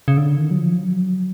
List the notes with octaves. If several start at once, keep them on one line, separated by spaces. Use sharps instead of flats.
C#3
D3
D#3
F#3
F3
F#3